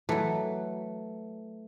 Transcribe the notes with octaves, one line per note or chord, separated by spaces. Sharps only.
E3 F#3 A3